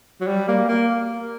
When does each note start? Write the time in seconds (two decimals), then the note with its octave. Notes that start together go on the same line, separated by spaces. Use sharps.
0.21 F#3
0.28 G3
0.48 A#3
0.68 A#3